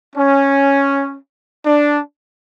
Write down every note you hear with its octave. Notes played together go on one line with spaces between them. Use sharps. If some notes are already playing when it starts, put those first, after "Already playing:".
C#4
D4